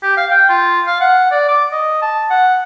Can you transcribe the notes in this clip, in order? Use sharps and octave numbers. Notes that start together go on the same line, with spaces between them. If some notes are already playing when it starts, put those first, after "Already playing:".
G4
F5
G5
F4
F5
F#5
D5
D6
D#5
A5
F#5